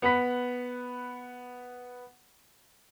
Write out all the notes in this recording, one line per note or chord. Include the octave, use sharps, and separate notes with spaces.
B3 F#5 B5 B6